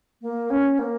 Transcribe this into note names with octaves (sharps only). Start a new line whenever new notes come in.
A#3
C#4
A#3